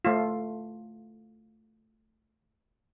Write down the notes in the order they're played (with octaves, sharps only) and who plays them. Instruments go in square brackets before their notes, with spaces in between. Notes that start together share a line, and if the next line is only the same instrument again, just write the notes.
[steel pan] A3 F4